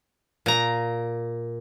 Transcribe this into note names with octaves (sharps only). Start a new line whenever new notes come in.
A#2 A#5